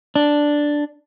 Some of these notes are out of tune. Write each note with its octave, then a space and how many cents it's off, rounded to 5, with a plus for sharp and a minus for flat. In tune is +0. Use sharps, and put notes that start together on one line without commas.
D4 +0